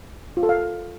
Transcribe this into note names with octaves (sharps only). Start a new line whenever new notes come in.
F4
A4
F5